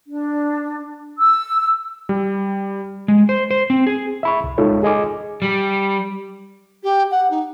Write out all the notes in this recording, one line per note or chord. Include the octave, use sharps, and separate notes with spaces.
D4
E6
G3
G#3
C5
C5
C4
G#4
E5 B5 C#6
C2
G#3 D#4 F4 A4 C#5
G#4 D#5 G#5 D6
G3
G4
F#5
D#4